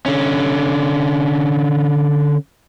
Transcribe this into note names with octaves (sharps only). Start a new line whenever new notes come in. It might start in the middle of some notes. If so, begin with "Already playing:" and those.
D3 C#4